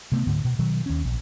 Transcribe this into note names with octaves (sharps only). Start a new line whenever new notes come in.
C3 A3 B3
D2 G#2 D3
B2
B2 D#3 F#3
D#2 C#4
A#1